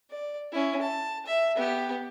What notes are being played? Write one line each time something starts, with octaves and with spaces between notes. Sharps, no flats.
D5
C#4 E4
A5
E5
B3 G4